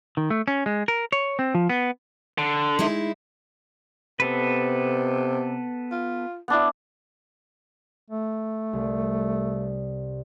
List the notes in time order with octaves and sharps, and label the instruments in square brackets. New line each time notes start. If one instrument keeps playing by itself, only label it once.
[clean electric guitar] D#3
A3
C#4
G#3
A#4
C#5
C4
F3
B3
[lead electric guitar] D3
[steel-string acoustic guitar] G#3 D#4 E4
[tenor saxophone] C3 [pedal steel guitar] B3 A4 B4
[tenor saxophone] F4
[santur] B3 D4 E4
[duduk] A3
[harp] C2